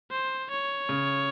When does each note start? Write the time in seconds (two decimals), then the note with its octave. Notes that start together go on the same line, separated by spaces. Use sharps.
0.12 C5
0.51 C#5
0.89 C#3